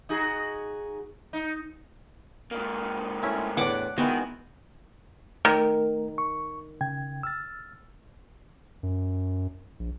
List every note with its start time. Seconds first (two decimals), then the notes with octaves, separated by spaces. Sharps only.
0.09 D#4 F#4 G#4
1.33 D#4
2.51 G#2 A#3
3.23 A3 C#4 E4
3.57 E2 A2 D4 F#5 D6
3.98 D#3 E3 G#3 B3 F#4
5.45 D#3 A3 A#4
6.18 C#6
6.81 C#3 G5 G#6
7.23 E6 F6 A6
8.83 F#2
9.79 A#1